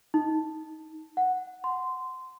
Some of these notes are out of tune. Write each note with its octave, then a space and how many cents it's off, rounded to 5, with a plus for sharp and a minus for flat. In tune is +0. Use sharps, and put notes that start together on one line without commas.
D#4 +20
F#5 -5
C6 -15